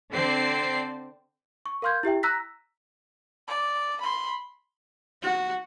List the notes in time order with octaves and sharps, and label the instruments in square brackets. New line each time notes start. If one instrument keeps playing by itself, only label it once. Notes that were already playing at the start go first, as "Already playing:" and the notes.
[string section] D3 C4 D5 C7
[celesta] C#6
A#4 F5 C6 F6 G6 G#6
E4 G4 E5 G5
A#5 E6 F#6 A#6 B6
[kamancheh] D5
B5 C6
[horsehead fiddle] F#4